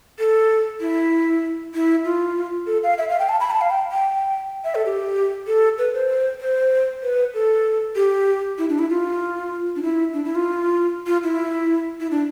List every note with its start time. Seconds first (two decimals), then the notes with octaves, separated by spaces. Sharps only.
0.19 A4
0.80 E4
1.74 E4
2.05 F4
2.67 A4
2.83 F5
2.98 E5
3.09 F5
3.19 G5
3.29 A5
3.40 B5
3.51 A5
3.61 F5
3.71 G5
3.92 G5
4.64 E5
4.75 A4
4.86 G4
5.47 A4
5.78 B4
5.94 C5
6.41 C5
7.03 B4
7.34 A4
7.96 G4
8.58 E4
8.69 D4
8.79 E4
8.90 F4
9.76 D4
9.83 E4
10.14 D4
10.25 E4
10.35 F4
11.07 F4
11.23 E4
12.00 E4
12.11 D4